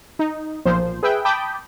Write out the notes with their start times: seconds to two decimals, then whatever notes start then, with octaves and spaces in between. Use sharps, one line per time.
0.19 D#4
0.65 B1 A#2 F3 C5
1.03 G#4 B4 E5 G5
1.25 G5 A5 B5 D6 D#6 G6